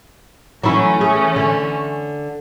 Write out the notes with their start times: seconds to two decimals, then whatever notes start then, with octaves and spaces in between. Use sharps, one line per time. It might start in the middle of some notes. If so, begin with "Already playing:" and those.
0.64 E3 F#3 A3 C#4 E4
1.01 G#4
1.36 D3